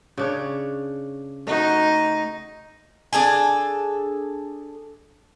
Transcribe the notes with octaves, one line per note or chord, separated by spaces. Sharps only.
C#3 D4 C#5
A3 D#4 F#4
D4 G#4 A4 G#5